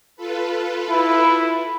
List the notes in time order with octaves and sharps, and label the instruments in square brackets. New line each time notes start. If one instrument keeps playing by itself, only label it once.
[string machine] F4 A4 B4
[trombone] E4